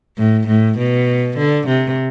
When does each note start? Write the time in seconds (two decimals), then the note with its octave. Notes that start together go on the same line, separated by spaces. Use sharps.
0.18 A2
0.48 A2
0.78 B2
1.37 D3
1.67 C3